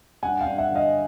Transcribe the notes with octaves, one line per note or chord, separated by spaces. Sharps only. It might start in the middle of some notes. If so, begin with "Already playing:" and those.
G2 F#5 G#5
F5 G5
G2
E5 F#5
D3
D#5 F5